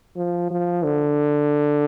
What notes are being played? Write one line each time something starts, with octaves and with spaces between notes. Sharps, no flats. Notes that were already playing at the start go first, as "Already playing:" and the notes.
F3
F3
D3